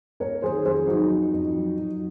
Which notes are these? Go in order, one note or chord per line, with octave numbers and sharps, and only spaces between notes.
A#3 A#4 C#5
D#3 G#4 C5
F2 G#4 C5
F#3 D#4 F#4
F2
F2
F#3
F#3